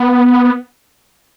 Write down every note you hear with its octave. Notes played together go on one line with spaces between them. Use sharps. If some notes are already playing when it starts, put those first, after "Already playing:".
Already playing: B3